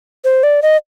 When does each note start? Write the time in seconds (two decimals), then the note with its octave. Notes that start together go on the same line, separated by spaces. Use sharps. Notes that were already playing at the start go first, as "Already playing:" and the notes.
0.24 C5
0.43 D5
0.62 D#5